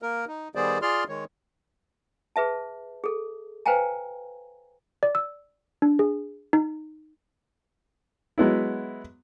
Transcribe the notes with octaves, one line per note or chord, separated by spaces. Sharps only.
A#3 A#4
D#4
D#3 G3 B3 G#4 C5 D5
F4 G#4 D5 C6 F6
D#3 G#3 C#5
G#4 B4 E5 A5
G#4 A4
B4 C5 F5 G5 G#5 A#5
D5
E6
D4
G#4
D#4
F#3 G#3 B3 E4